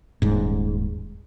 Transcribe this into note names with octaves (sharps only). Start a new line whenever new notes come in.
D#1 G#2